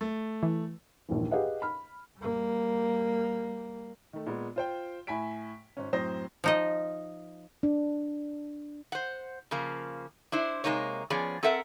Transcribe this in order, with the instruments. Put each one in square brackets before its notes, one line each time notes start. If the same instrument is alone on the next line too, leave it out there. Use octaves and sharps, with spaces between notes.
[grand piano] A3
[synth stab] E3
[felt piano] A#1 D#2 G#2 E3
G4 G#4 B4 D#5 F5 F#5
B5 F6
[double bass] G3 A#3
[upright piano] D#3 A3
A#2 G#3 B3
F4 C5 G5
A2 E5 G#5 B5 B6 D7
G#1 C#4
F#2 A2 C4 C5 D#6 A#6
[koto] F3 D#4 D#5
[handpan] D4
[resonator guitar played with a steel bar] C5 F#5
C#3 F3 A#3
D4 E4 C5
C3 G#3 A#3 D#4 C#5
F3 B3 C#4 G#4 D5
C4 A4 A#4 E5 F#5